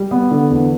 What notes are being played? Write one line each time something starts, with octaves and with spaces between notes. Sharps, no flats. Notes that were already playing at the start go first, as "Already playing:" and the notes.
Already playing: G3
B3
D3
E2